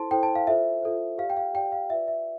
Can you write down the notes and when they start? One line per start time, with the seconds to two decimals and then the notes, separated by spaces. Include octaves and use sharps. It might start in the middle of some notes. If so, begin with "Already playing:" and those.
Already playing: E4 A4 C5 A5 C6
0.11 E4 A4 C5 G5
0.23 A5
0.36 F5
0.47 F4 A4 C5 E5
0.82 F4 A4 C5
1.18 G4 D5 F5
1.30 G5
1.37 F5
1.54 G4 D5 G5
1.72 F5
1.90 F4 B4 D5 E5
2.08 E5